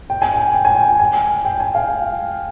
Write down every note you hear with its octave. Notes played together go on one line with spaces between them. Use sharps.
G5
G#5
G5
G5
G#5
G5
G#5
G5
G#5
F5